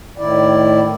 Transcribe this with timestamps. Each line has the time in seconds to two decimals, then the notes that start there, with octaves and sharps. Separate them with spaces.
0.18 A2 D#3 E4 D5